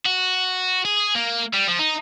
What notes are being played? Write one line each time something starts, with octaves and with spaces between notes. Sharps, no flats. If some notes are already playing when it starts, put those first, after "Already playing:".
F#4
G#4
A#3
G3
F3
D#4